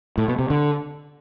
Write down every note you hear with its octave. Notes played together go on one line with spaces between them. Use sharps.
A2
B2
C3
D3